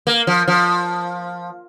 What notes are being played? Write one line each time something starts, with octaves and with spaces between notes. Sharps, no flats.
A#3
F3
F3